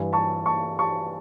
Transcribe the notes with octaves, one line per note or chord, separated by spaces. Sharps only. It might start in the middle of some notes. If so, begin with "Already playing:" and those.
Already playing: G2 E3
A5 C#6
A5 C#6
A5 C#6